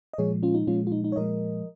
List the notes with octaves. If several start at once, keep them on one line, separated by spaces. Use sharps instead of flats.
D#5
A#2 F3 G#3 G#4 C#5
C#4 F4
D#4
A#2 F3 G#3 C#4 F4
F4
D#4
D#4
C#5
A#2 F3 G#3 A#4 D#5